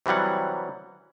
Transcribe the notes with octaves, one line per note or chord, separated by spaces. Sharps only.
C3 E3 F#3 G3 F#5